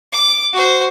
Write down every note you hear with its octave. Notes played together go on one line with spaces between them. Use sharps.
D6
F#4 C5